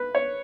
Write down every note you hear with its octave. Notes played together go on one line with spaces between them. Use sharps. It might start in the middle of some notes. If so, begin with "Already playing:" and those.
Already playing: B4
C#5